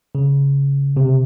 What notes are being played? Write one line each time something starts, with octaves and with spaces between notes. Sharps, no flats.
C#3
C3